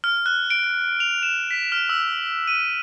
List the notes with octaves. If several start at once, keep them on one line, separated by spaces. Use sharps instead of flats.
F6
F#6
D7
F7
E7
B6
F6
E6
D#7